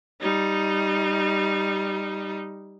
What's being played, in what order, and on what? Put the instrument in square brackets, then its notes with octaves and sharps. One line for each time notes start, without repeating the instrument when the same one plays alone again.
[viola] G3 D#4